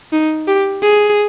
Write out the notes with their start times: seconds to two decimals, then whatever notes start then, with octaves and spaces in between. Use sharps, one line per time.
0.12 D#4
0.48 G4
0.82 G#4